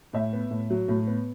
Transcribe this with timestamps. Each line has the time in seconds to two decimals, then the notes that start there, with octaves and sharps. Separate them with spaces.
0.13 A2 E5
0.33 B3
0.51 A2
0.70 F#3
0.88 A2
1.07 B3